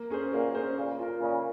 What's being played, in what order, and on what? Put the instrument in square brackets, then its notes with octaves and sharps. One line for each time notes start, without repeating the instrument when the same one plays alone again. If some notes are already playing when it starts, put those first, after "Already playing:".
Already playing: [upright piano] A#3
C#4 G#4 C5
[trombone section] F#2 A#2 [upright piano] A#3
[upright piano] C#4 G#4 C5
[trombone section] A#2 C#3 [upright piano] A#3
[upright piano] F4 A#4
[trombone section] A#2 C#3 [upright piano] A#3